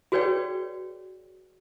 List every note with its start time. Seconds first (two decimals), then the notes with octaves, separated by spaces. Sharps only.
0.12 F#4 G#4 B4 C#5 D5 G5